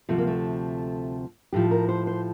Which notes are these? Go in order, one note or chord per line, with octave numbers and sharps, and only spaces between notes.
D2 C3 F3 A3
A#3
A3
A2 F3 G4
A#4
C5
C5